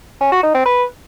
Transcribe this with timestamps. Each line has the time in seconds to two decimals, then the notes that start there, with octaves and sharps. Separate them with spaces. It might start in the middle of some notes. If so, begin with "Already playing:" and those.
0.21 C#4
0.32 F#4
0.43 D#4
0.54 C4
0.66 B4